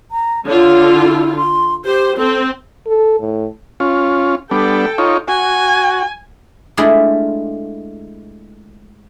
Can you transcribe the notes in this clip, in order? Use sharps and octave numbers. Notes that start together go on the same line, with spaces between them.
A#5
D3 F4 C#5
E4
C6
G4 C5
C4 A4
A4
A2
C#4 F4
G3 B3 D4 A4 G5
D#4 F4 C#5
F#4 G#5
G#3 A3 D4 E4 F4 G#4